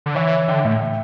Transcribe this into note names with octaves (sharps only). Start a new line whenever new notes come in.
D3
E3 C#5 E5
D3 E5 G5
A2 E5 G5
E5 G5